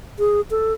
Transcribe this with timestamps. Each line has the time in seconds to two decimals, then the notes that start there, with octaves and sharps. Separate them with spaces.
0.19 G#4
0.51 A4